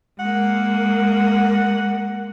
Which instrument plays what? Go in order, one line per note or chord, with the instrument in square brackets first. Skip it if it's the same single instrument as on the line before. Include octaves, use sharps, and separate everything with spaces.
[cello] G#3 A#3 [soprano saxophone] F#5